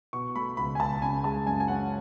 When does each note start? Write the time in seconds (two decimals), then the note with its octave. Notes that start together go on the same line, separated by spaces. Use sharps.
0.13 B2 C#6
0.36 A3 B5
0.57 C#2 B5
0.75 G#5
0.80 C#2 A5
1.02 C#3 G#5
1.24 G#3 A5
1.46 F#2 G#5
1.60 G#5
1.68 C#4 F#5